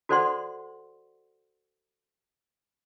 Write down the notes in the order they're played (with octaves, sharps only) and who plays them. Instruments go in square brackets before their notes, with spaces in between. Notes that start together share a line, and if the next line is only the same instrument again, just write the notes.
[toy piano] F#4 A4 C5 D5 F#5 C6